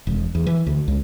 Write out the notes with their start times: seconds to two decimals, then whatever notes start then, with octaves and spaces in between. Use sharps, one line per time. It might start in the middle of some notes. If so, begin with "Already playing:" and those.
0.07 E1
0.35 E2
0.47 E3
0.67 D2
0.88 C#2